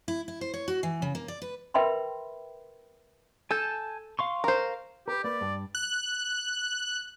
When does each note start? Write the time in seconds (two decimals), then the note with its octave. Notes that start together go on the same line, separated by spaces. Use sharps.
0.08 E4
0.28 E4
0.41 C5
0.54 C#5
0.68 F#4
0.83 E3
1.02 C#3
1.15 A#3
1.28 D5
1.42 B4
1.74 A#4 B4 E5 G5 B5 C6
3.51 A4 G#5 A5 G6
4.19 F5 C6 C#6
4.44 A#4 C5
5.08 G4 A#4 B4
5.24 A#3 B4 D5
5.41 G2
5.75 F#6